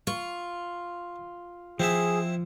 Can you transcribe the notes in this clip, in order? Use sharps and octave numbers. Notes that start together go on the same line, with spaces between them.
F4 C#6
F3 C4 E4 G#4 E5